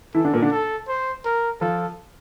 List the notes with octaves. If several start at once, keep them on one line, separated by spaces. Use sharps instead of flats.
E3 E4 A4
D3 D4
A#2 A#3
D3 D4
A4
C5
A#4
F3 F4 A4